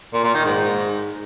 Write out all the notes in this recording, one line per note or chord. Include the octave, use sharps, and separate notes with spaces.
A#2
A#2
D#3
G#2